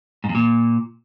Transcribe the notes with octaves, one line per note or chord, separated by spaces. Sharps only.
G#2
E2
A#2